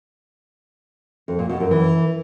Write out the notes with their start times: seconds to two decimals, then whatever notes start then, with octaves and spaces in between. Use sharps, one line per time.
1.28 F2
1.39 A#2
1.49 B2
1.60 F#2
1.71 E3